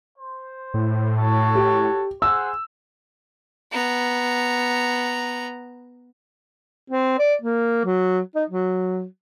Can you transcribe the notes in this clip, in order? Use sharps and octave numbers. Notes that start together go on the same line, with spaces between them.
C5
A2
F#4 A4 C#5
G4
G#4 C5 F#5 E6
B3 A#5
C4
D5
A#3
F#3
D#4
F#3